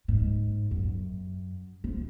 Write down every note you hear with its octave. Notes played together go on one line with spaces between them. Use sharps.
G#2
F#2
F3